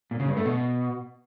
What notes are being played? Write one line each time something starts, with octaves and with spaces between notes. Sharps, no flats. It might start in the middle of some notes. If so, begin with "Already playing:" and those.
A#2
C#3
G2
A3
B2